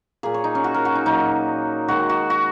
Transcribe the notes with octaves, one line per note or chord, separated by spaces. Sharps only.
A#2 A#3 G#4
C#5
D#4
C#4
F#4
A#4
F#4
D#4
A#2 F#3 A#3 D#4
D#3 G#3 F#4
F#4
F#4